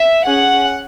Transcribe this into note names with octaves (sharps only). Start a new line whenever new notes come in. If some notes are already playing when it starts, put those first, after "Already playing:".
Already playing: E5
C#4 G#4 F#5